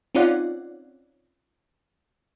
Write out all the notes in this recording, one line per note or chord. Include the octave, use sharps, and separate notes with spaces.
C4 C#4 D#4 F4 D5 F#5